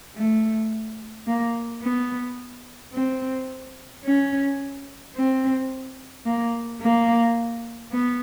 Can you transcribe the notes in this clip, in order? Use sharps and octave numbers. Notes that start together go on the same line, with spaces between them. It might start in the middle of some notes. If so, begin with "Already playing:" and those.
A3
A#3
B3
C4
C#4
C4
A#3
A#3
B3